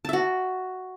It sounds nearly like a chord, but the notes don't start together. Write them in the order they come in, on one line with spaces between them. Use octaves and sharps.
A5 E5 F#4